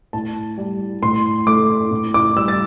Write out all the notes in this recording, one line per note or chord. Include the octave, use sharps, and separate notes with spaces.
A2 A5
G3
A2 C6
A3 D6
A2
D6
G3 E6
A6